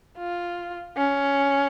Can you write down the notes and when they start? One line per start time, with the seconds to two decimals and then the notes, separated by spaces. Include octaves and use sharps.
0.18 F4
0.97 C#4